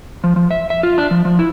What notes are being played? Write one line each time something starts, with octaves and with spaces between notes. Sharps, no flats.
F3
F3
E5
E5
F4
D4
F3
F3
E4